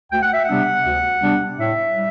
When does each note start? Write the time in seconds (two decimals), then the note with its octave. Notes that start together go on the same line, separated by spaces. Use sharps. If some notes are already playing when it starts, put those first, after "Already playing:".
0.12 D2 G5
0.23 F#5
0.34 E5
0.45 C3 G3 B3 D4 F#5
0.85 D2
1.22 C3 G3 B3 D4
1.59 A2 E5
1.96 G3